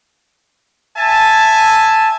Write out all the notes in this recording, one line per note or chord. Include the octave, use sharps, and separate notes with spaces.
E5 G#5 A5